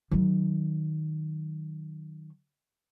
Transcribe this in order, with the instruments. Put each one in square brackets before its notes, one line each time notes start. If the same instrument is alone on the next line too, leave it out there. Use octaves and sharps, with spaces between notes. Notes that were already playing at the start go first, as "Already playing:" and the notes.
[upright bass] D#3 F#3